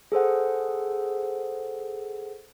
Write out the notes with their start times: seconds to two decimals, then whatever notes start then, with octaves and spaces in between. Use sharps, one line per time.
0.12 G#4 A4 C5 F#5